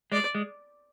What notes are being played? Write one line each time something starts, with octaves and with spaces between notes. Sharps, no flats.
G#3 D5
G#3